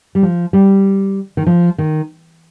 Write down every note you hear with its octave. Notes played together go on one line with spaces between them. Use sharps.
G3
F3
G3
D#3
F3
D#3